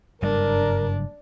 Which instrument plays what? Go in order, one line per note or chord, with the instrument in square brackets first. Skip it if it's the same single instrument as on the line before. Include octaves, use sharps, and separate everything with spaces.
[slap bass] F#1 G2 G3 [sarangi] D4 [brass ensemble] A#4